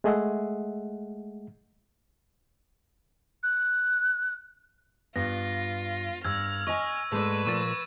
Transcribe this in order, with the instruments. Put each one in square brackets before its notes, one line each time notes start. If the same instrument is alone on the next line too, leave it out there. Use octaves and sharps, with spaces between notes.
[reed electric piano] G#3 A3 G#4 D#5 E5 F#5
[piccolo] F#6
[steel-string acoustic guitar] G2 [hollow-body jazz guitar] B3 [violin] F4 [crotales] A#6
[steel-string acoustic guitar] G2 [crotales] E6 G#6 [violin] F6
[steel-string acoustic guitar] D#5 G#5 [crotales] C#6
[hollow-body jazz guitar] G#2 G#3 [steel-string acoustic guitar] A3 D5 [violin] B4 E6
[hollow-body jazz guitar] A#2 F3 A#3 [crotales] C#6 A6